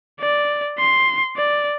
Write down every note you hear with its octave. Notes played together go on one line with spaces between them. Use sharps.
D5
C6
D5